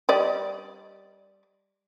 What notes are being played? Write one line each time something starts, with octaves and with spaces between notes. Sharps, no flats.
G3 D5 D#5